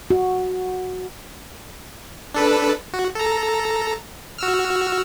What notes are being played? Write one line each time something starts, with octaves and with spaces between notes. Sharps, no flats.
F#4
D4 A4 B4
F#4
A4 A#5
F#4 E6 F6